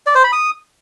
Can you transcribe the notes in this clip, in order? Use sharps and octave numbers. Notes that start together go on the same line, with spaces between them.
D5
C5
B5
D#6